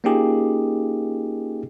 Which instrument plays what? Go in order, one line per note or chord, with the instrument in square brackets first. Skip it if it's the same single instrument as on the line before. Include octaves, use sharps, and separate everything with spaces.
[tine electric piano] A#3 C#4 D#4 F4 G4 G#4